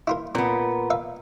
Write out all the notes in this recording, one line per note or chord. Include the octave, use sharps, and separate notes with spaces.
E4 F4 A#4
A#2 B3 C4
E5 F5